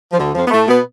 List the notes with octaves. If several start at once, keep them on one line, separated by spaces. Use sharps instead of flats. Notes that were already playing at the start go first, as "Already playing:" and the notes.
F3
D2 D3
F2 F3
B3
A2 A3
B2 B3